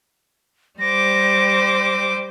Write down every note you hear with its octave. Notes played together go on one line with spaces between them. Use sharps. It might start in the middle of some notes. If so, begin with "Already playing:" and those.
G3 C5 D6 A#6